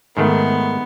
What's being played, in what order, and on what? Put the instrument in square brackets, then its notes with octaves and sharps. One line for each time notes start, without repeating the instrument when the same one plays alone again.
[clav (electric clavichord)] G#2 D#3 A3 [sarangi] B3